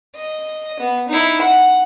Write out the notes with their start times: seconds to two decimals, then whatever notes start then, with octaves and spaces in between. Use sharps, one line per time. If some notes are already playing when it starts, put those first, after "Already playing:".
0.16 D#5
0.80 B3
1.09 D#4 E4
1.41 F#5